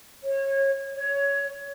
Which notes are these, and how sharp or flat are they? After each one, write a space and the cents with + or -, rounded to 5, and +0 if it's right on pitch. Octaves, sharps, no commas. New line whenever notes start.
C#5 -25
C#5 +15